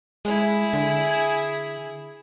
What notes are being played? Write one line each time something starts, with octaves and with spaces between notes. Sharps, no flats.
G#3 E4 G#4
D3